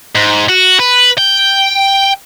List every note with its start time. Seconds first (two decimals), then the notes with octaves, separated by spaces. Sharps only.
0.15 G#2
0.49 F#4
0.80 B4
1.18 G5